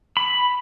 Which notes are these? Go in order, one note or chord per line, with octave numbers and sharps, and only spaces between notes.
B5